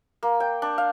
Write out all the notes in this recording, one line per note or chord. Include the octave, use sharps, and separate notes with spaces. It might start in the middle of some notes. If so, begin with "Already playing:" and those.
A#3
G5
D4
F5